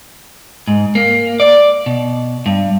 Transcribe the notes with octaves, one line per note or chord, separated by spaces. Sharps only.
G#2
A#3
D5
B2
G2